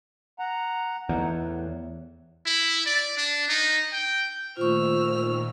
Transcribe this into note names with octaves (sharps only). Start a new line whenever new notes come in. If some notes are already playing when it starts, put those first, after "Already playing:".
F#5 A#5
E2 A3 D#4 F#5
A2
E4
D5
D4
D#4
G5
A#2 D#3 A3 F4 C5 C#6 E6 F6